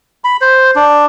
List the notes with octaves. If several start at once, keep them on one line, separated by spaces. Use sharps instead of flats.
B5
C5
D4